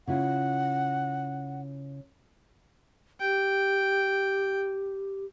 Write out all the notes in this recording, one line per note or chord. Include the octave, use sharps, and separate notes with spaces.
C#3 E4 F4 F#5
G4 G5